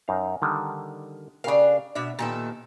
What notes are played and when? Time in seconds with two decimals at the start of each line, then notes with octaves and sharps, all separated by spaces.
0.08 F#2 D#4 F5
0.42 D3 D#3 G3
1.44 C#3 D4 G4 A#4 F5
1.95 B2 D4 E5
2.19 A#2 D#3 B3 G4 A4